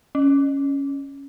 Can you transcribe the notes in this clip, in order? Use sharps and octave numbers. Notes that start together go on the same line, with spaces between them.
C#4